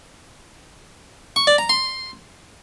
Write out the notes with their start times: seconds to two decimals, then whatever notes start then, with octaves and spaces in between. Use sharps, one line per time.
1.36 C#6
1.47 D5
1.58 A#5
1.69 C6